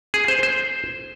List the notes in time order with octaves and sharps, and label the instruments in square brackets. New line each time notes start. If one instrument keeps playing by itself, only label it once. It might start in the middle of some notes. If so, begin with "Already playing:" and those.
[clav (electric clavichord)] G#4
C5
C5